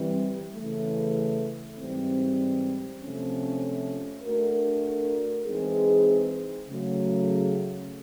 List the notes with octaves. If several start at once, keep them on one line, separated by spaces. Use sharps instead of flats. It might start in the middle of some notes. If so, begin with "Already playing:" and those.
Already playing: E3 G3 C4
C#3 E3 A3
G#2 E3 G3 C4
C3 F3 A3 C#4
A3 D4 F#4 A#4
E3 G#3 C4 D#4 G#4
C#3 F#3 A3